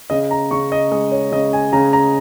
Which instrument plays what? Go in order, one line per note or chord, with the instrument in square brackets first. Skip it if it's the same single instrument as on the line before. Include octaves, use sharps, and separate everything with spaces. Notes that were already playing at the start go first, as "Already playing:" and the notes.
[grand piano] C#3 D#5
A#5
C#3 C#6
D#5
G#3 D#5
C#5
C#3 D#5
G#5
C#3 A#5
A#5